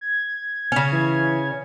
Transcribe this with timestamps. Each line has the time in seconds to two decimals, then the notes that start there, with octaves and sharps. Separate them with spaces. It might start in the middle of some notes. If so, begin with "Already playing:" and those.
0.01 G#6
0.72 C#3 C#4
0.92 E3